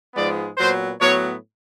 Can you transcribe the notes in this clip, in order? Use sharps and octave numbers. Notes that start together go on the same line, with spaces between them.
G#2 F3 G#3 B3 D5
A#2 F#3 B3 C5
A2 F#3 B3 C#5